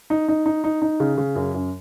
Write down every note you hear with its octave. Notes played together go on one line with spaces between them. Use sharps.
D#4
D#4
D#4
D#4
D#4
C#3
C#3
F#2
F#2